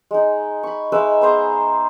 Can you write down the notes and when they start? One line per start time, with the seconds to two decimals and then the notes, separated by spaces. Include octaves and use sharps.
0.11 G#3 D#4
0.63 B5 C#6
0.92 G#3 D#4 B4 E5
1.21 B3 G#4 C5 A#5